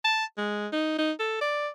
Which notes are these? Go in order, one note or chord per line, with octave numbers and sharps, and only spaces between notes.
A5
G#3
D#4
D#4
A4
D5